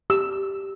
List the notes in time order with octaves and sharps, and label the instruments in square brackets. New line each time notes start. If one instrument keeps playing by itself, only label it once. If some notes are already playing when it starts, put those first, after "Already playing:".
[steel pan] G4 E6